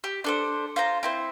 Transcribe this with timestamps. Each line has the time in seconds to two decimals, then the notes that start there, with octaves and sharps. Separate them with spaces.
0.04 G4
0.24 D4 A4 C5
0.76 F4 C5 A#5
1.03 C4 E4 C5